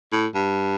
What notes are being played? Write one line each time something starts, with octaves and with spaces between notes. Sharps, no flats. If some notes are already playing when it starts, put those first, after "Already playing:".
A2
G2